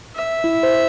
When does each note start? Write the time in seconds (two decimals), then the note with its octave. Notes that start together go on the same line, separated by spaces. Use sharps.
0.16 E5
0.44 E4
0.63 C5